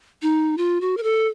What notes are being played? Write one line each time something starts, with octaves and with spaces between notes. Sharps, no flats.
D#4
F4
F#4
A#4
A4